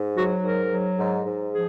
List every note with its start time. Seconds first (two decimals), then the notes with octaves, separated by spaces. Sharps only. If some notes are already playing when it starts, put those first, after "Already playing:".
Already playing: G#2
0.16 F#3 F#4
0.43 G#2 A#4
0.71 F#3
0.99 G#2
1.26 G#2
1.53 F3 G#4